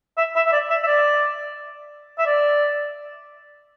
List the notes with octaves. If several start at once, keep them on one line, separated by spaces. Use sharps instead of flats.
E5
E5
E5
D5
E5
E5
D5
E5
D5